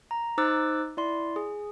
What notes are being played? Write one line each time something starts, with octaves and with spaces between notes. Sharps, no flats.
A#5
D#4 C5 D6 E6 F#6 A6
E4 D5 C6
G#4